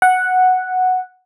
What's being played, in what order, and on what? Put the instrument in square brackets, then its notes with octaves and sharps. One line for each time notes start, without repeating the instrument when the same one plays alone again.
[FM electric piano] F#5